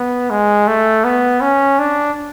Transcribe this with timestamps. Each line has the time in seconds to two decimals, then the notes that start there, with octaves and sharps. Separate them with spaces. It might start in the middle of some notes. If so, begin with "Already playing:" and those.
Already playing: B3
0.30 G#3
0.67 A3
1.05 B3
1.42 C#4
1.79 D4